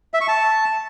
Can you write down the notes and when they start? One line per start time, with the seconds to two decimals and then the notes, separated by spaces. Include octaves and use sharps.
0.14 E5
0.21 C#6
0.28 A5